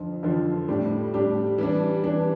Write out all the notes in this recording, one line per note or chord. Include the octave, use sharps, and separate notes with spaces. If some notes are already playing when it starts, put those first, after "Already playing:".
Already playing: F2 D3 F3
F2 D3 F3
A2 G3 D4 G4
A2 G3 D4 G4
E3 G3 D4
E3 G3 D4